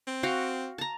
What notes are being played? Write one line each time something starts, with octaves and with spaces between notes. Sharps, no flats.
C4
F#4 F5 G5
A5 A#5